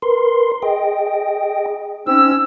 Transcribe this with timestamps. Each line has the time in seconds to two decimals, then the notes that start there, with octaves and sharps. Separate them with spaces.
0.02 A#4 B4 C6
0.62 G#4 D#5 G5
2.07 C4 C#4 D#4 E6